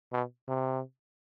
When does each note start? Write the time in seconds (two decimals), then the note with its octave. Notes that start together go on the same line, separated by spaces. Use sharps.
0.12 B2
0.48 C3